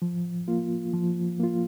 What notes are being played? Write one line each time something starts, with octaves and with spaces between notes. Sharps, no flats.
F3
A#3 F4
F3
A#3 F4